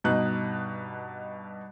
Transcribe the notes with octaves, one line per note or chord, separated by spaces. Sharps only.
G2 B2 D#4 F#6